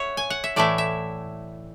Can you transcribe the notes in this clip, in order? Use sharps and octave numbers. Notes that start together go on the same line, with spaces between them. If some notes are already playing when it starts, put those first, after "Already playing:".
Already playing: C#5 E5 F#5
G#5
F#5
E5
A2 E3 A3 E4 D5
E5